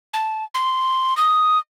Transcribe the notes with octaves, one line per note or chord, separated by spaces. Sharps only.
A5
C6
D#6